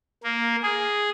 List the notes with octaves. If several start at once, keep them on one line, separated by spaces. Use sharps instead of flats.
A#3
G#4